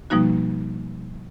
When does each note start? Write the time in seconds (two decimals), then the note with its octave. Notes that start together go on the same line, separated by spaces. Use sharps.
0.10 B2 F3 G3 A#3 D#4 F#4